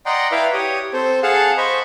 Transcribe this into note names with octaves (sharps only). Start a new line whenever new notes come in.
D5 D#5 F#5 G5 A#5 C6
E4 B4 D5 E5 F5 G5
G4 C#5 D#6
C4 A4 C5
G#4 A4 F5 F#5 A5
C5 D#5 B5 C#6